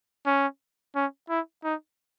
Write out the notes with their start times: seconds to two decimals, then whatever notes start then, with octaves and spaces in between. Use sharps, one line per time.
0.26 C#4
0.95 C#4
1.30 E4
1.64 D#4